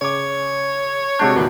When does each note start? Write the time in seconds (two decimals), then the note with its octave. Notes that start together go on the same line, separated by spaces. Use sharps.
0.01 C#3 C#5 D6
1.19 C3 G#3 D4 F#4 G6
1.36 E2 A#2 D#3 B3